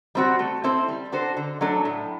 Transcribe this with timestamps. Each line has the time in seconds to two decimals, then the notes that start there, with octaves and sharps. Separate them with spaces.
0.15 G3 C4 F#4
0.39 A3
0.64 C4 E4 A4 C5
0.88 G3
1.12 D4 F#4 A4 C5
1.37 D3
1.61 F#3 A3 D4 A4
1.85 A2